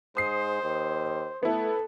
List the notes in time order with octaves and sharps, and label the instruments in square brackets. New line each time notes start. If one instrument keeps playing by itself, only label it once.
[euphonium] G#2 [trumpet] C5 [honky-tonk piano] D#6 C7
[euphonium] D#2
[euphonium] A3 [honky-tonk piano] B3 E4 [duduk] A4